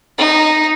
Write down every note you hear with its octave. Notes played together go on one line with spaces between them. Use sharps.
D#4